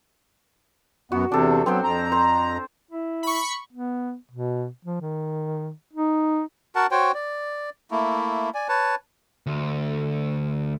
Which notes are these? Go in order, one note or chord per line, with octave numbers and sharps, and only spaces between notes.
F#2 B3 F#4
E2 C3 D4 A4
F#3 B3 C4 C5 G5
F2 A#5
C5
E4
B5 C#6
B3
B2
F3
D#3
D#4
F#4 A#4 F#5 A5
F#4 C5 C#5 G5
D5
A3 A#3 E4
D5 G#5
B4 C#5 A5
D2